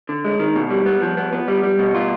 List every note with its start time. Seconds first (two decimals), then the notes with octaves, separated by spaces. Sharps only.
0.09 D3
0.25 G#3
0.39 D#3
0.56 B2
0.70 G3
0.86 B3
1.02 F3
1.17 B3
1.33 B3
1.48 G3
1.63 G3
1.79 B2
1.94 F4